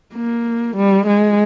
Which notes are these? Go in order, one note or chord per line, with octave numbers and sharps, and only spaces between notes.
A#3
G3
G#3